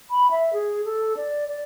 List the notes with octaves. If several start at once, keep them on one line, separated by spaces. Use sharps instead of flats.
B5
E5
G#4
A4
D5
D5